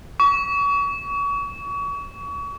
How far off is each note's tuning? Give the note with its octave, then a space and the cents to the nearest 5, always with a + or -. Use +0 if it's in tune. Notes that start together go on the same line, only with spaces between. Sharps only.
C#6 +35